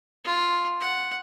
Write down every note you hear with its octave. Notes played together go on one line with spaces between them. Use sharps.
F4
F#5